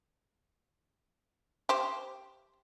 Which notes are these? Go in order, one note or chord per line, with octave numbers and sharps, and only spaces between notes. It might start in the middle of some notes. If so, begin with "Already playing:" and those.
G4 C5